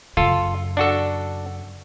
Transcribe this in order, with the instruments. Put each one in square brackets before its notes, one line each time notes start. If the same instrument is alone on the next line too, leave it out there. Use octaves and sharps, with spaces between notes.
[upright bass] F#2 C#3 [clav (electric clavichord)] F4 A4
[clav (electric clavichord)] D4 F#4 A4